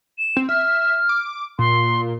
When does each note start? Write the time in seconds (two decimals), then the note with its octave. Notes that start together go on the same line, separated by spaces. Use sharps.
0.18 E7
0.37 C4
0.49 E5 F6
1.09 D6
1.59 A#2 C6